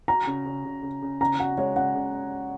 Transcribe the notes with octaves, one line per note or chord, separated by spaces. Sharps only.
F#4 A#5
C#3
C#3
C#3
C#3
C#3
C#3 A#5
F#4 F#5
G#3 C#5
C#3 F#5
C#3